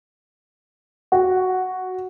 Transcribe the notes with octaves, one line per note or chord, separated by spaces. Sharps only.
F#4